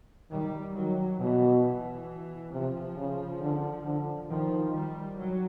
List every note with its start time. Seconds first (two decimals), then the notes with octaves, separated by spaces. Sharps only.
0.31 D#3 G3
0.75 D#3 F#3
1.20 B2 E3
1.63 E3
2.52 C3 F3
2.96 C#3
3.41 D3
3.85 D3
4.29 D#3 F3
4.74 G3
5.18 F#3